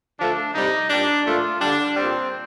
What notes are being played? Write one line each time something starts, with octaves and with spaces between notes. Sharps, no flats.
D3 F3 A3 D4
C3 G3 D#4
A#2 G3 D4
A#2 F3 A3 F4
D3 G3 D4
A#2 G3 C4